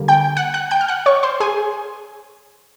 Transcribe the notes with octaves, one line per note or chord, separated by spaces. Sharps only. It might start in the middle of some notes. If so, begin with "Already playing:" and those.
Already playing: D3 G3 A#3
G5 G6
F#5 F#6
F#5 F#6
G5 G6
F6
F#5 F#6
C#5 C#6
C5 C6
G#4 G#5